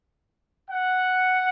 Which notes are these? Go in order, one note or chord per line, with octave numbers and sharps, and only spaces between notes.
F#5